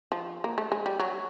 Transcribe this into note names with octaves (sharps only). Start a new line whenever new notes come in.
F3
A#3
A3
G#3
G3
F#3